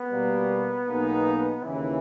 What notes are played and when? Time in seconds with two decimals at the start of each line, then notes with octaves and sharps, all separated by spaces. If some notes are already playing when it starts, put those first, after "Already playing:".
Already playing: B3
0.10 B2 G3 A#3
0.87 B1 B2 A#3 D#4 G#4
1.63 D#2 C#3 E3 E4